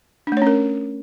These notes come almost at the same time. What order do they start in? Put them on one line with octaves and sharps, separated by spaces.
D4 A3 C#5 C#4 A#4